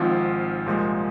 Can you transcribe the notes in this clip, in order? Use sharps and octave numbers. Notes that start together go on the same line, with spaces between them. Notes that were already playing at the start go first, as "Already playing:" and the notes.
Already playing: G#1 G#2 F3 C4 F4
C2 A#2 F3 G#3